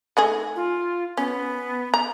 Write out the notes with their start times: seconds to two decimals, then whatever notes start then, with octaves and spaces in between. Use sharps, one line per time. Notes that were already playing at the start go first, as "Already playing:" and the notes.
0.17 A3 D#4 G#4
0.56 F4
1.17 B3 C#4
1.94 A#5